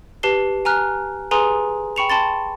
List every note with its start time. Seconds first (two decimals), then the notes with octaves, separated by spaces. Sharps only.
0.23 G4 B4 A5 C7 G7
0.65 G#5 A#5 F6 F#6
1.31 G#4 B4 G#5 A#5 C6 D#6
1.96 G5 B5 C#6 C#7 E7 F7
2.10 G5 A5 B5 C6 A6